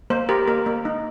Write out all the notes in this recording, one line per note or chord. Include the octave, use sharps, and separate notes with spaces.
A#3 C5
G4 A#4
A#3 A#4
A#3
D#4